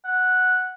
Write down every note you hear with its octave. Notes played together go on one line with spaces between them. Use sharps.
F#5